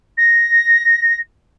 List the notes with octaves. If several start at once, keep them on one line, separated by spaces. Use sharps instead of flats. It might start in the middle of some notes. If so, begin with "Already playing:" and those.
A#6